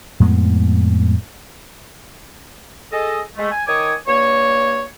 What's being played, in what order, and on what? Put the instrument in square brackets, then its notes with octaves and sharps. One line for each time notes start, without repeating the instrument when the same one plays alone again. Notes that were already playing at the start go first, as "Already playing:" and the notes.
[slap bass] F2 A2 G#3 B3
[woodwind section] G#4 A4 D#5
G#3 A3
G#5
D#3 C#5 G#5 D6 D#6
G2 A#3 C#5